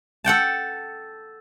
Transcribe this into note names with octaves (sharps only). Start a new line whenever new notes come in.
A4 F#5 G5 A5